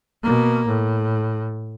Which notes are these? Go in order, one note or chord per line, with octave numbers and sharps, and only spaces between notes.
B2 A#3
A2